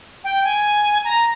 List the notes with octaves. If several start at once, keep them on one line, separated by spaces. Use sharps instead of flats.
G5
G#5
A#5